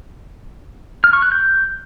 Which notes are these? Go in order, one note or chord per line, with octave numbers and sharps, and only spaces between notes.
F6
C#6
F#6
G6